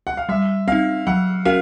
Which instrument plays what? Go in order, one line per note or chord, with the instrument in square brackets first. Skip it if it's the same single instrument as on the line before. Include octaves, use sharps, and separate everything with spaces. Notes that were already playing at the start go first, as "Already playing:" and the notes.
[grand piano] F#5
F5
[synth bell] G3 [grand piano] E5
[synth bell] C4 D#4 [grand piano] F5
[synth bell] F#3 [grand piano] F#5
[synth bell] C#4 F#4 A#4 [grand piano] F5